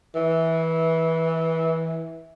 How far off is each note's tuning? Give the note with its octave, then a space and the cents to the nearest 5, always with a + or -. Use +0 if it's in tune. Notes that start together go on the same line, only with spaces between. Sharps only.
E3 -20